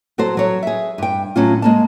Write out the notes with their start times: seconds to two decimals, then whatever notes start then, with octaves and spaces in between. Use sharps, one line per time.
0.18 F#3 F#4 A4 C5
0.37 F#3 C#5
0.63 G#4 E5
0.98 G2 G5
1.36 A2 F#3 C#4 F4
1.62 G#3 A#3 A5